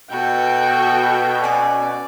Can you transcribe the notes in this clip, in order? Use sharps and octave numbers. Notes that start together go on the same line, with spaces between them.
B2 F#4 A4 G5
C#4 D5 G#5